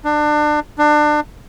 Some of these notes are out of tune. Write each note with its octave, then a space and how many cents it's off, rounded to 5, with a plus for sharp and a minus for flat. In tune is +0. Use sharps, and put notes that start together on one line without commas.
D4 +30
D4 +30